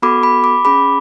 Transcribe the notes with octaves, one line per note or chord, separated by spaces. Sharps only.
B3 F#4 A4 B5 D6
B5 D6
B5 D6
C#4 G#4 B5 D6